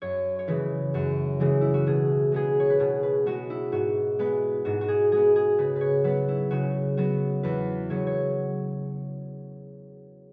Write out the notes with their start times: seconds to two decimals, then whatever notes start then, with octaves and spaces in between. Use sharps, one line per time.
0.02 F#2 C#5
0.39 C#5
0.48 C#3 E3 G#3 B4
0.94 F#2 F#4
1.40 C#3 E3 G#3
1.61 E4
1.74 F#4
1.86 B2 G#4
2.32 G#3 B3 G#4
2.60 C#5
2.70 B4
2.80 B2 G#4
3.03 B4
3.26 G#3 B3 F#4
3.50 E4
3.72 G#2 F#4
4.19 G#3 B3 B4
4.65 G#2 F#4
4.81 F#4
4.88 G#4
5.12 G#3 B3 G#4
5.36 G#4
5.58 C#3 B4
5.76 B4 C#5
6.04 F#3 B3 B4
6.28 E4
6.51 C#3 F#4
6.97 F#3 B3 F#4
7.43 E2 B4
7.90 C#3 F#3 C#4 C#5
8.07 C#5